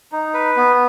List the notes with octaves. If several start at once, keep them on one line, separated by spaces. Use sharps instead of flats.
D#4
B4
B3